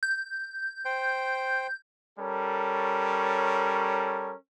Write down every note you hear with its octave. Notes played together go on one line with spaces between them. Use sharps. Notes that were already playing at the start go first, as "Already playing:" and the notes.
G6
C5 G5
G3 C#4 A4 A#4 C#5